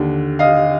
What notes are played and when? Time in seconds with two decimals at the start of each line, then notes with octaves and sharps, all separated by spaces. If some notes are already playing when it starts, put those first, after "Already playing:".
Already playing: D#2 D3
0.39 D#5 F5